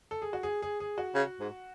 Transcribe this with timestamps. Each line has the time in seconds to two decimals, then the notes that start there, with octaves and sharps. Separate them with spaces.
0.11 A4
0.22 G#4
0.33 F#4
0.43 G#4
0.62 G#4
0.80 G#4
0.98 F#4
1.15 C#3
1.40 G#2